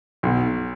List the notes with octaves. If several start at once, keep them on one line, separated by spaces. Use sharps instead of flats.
B1